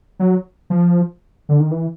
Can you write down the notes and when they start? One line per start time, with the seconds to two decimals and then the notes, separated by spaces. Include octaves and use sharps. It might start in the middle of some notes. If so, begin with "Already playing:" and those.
0.20 F#3
0.70 F3
1.49 D3
1.60 D#3
1.71 E3